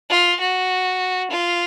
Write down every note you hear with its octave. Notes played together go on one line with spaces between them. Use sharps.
F4
F#4
F4